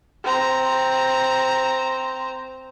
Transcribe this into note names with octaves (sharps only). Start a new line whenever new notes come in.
C4 A#5